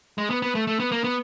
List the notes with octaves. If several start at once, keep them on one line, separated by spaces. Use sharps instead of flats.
G#3
B3
B3
A3
A3
B3
A#3
B3